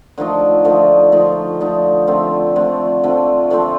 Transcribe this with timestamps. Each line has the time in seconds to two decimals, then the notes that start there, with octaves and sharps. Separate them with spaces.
0.18 D3 F3 A3 D#4
0.65 D3 F3 A3 D#4
1.12 D3 F3 A3 D#4
1.60 D3 F3 A3 D#4
2.07 D3 F3 A3 C4
2.56 D3 F3 A3 C4
3.04 D3 F3 A3 C4
3.50 D3 F3 A3 C4